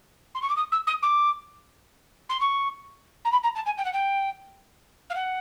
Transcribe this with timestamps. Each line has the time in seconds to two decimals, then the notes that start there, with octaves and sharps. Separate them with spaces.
0.35 C6
0.42 C#6
0.49 D6
0.56 D#6
0.72 E6
0.87 D#6
1.02 D6
2.29 C6
2.40 C#6
3.25 A#5
3.32 B5
3.43 A#5
3.55 A5
3.66 G#5
3.78 G5
3.85 F#5
3.93 G5
5.10 F5
5.15 F#5